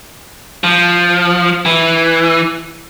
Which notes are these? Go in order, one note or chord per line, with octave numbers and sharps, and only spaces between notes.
F3
E3